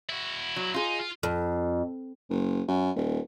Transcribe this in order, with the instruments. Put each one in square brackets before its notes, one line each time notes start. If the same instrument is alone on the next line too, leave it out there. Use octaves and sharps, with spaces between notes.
[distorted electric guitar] E4 F#4
[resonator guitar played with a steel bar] F#3
[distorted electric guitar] D#4 [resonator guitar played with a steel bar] F4 G#4
[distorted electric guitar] F4
[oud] F2
[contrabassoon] F#1
F#2
D#1